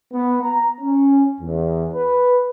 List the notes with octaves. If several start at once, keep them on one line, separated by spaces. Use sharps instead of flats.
B3
A#5
C#4
E2
B4